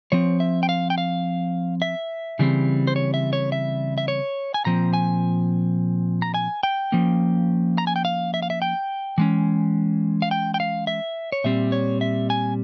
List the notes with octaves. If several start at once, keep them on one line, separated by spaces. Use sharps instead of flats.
F3 C4 C#5
E5
G5
F5
G5
F5
E5
C#3 E3 G3 C4
C5
C#5
E5
C#5
E5
E5
C#5
G#5
A#2 F3 C4 A#5
G#5
A#5
G#5
G5
F3 A#3 C#4
A#5
G#5
G5
F5
E5
F5
E5
G5
E3 G#3 C#4
F5
G5
G5
F5
E5
C#5
A#2 G3 C4 E5
C#5
E5
G#5